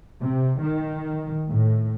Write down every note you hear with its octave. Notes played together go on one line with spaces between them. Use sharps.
C3
D#3
A2